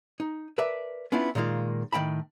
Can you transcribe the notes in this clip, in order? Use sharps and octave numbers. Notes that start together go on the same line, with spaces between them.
D#4
A#4 B4 D5 E5 A5
B3 C#4 D4 E4 F4
A#2 D#3 G#3 A#3 F4
A2 D#3 C4 G5 A5 B5